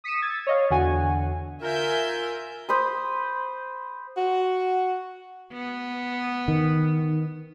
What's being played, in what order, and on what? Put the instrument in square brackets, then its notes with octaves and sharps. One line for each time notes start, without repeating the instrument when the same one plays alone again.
[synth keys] D#6 B6 C#7 D#7 E7
E6 G#6 A6
C#5 D#5 F5
E2 D3 F#4 F#5 G#5
[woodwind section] F4 A#4 [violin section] E5 G#5 G6
[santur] C5 B5 D#6
[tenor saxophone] F#4
[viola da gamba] B3
[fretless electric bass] D#3